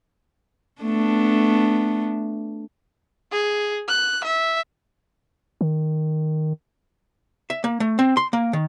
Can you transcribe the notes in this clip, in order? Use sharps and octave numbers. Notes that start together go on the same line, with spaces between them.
A3 B3 D4
G#4
F#6
E5
D#3
E5
A#3
A3
C4
C6
A#3
D#3